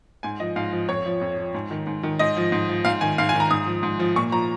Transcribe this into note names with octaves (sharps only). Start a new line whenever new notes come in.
G#2 G#5
F3 D#5
G#2 F5
F3
F2 C#5
F3
F2
F3
G#2
D#3
G#2
D#3
G#2 D#5
F3
G#2
F3
G#2 F5
D#3 G#5
G#2 F5
G#5
D#3
A#5
G#2 D#6
F3
G#2
F3
A#2 C#6
F3 A#5